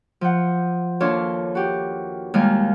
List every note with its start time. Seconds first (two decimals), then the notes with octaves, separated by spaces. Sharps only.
0.21 F3 F#5
1.00 D#2 D4 F4 A4 C#5 F5
1.55 F#4 G4
2.34 D#2 D#3 G3 G#3 F5